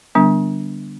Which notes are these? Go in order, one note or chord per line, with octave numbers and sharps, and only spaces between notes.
D3 G3 B3 D4